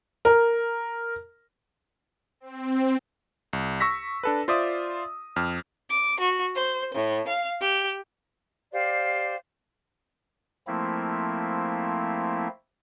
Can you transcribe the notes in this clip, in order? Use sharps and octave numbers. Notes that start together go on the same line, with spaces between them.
A#4
C4
C2
C#6 E6 A#6 B6
D4 A4 B4
F4 C5 D5 E5 D#6
F2 F6
D6
F#4
C5
A2
F5
G4
G4 C5 D5 F5
F3 A3 A#3 C4 E4